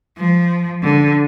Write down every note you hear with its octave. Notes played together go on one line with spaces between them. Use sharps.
F3
D3